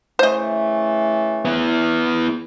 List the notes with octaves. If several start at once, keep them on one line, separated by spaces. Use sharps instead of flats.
C#3 E3 A3 C5 D#5
B3 E4